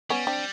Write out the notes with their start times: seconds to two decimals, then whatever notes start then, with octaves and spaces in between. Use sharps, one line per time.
0.10 G3 B3 C#4
0.27 C4 D4